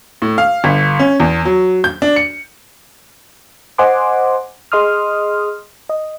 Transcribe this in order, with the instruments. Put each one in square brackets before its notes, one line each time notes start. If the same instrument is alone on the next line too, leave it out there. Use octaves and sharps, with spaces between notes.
[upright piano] A2
F5
G1
C#4
E2
F#3
G6
D4
C#7
[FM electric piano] C5 D#5 F#5 G#5 C6 D6
G#4 D#5 C6 D#6 F6
D#5